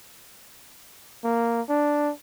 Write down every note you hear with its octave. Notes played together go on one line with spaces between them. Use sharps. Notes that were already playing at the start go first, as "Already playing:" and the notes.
A#3
D4